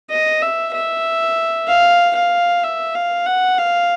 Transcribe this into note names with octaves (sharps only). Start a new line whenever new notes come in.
D#5
E5
E5
F5
F5
E5
F5
F#5
F5